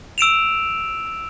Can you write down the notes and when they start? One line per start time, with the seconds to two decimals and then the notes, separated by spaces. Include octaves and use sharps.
0.18 E6 D7 E7 F7